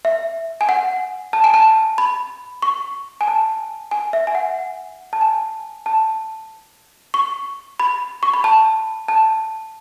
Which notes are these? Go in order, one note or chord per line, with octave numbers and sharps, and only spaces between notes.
E5
G#5
F#5
A5
G#5
A5
B5
C#6
G#5
A5
G#5
E5
G#5
F#5
A5
G#5
A5
C#6
B5
C#6
B5
A5
A5